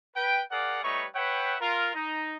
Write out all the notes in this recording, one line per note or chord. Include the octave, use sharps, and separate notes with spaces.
B4 G5
G#4 A#4 D5 F5 F#5
G3 A3 D#4 B4 C#5 C#6
B4 C#5 E5 F#5 G5
F4 A#4
D#4